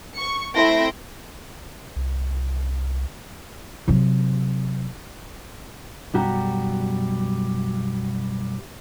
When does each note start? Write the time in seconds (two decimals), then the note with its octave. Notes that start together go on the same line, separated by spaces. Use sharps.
0.13 C#6 C#7
0.54 A3 C4 E4 C6 A#6 D7
1.96 C2
3.88 C3 F#3
6.14 B1 F#2 G3 F#4 G4 A#5